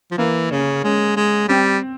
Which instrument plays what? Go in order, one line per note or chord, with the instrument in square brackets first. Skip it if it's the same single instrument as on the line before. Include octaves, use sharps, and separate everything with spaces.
[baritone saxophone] F3
[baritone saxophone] E3 [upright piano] A#3
[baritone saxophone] C#3 [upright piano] C#4
[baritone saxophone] G#3 [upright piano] C#4
[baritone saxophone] G#3
[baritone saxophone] G3 [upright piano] C4